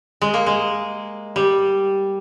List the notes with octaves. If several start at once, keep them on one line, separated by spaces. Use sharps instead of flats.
G#3
A#3
G#3
G3